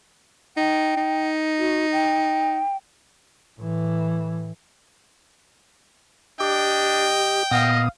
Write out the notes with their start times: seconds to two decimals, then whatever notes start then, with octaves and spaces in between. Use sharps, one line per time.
0.57 D#4 G5
0.97 D#4
1.59 F#4
1.92 G5
3.59 A2 E3
6.40 D4 G4 D#5 G5
7.51 A#2 B3 D#5 F5 D#6